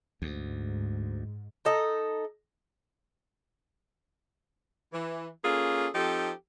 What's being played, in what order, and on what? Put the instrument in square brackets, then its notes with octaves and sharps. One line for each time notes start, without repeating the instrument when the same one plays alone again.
[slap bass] D2 [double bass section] G#2
[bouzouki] D#4 A4 D#5
[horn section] E3
A#3 C#4 F4 G#4 A4
F3 C4 D#4 G4 A4